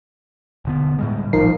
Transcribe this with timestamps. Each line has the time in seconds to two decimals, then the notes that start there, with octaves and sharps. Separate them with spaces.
0.65 E1 D3 B3
0.99 A2 G3 G#3
1.33 E1 A#1 F3 D#4 A#4 C7